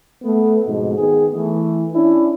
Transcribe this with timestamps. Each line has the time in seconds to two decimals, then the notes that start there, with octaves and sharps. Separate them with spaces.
0.23 A3 B3
0.65 F2 G#2 B2 G#3
0.97 D#3 B3 G#4
1.35 E3 A3
1.93 C#4 D4 E4